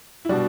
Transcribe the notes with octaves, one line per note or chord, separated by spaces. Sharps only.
E4
B2 G3 D4 F#4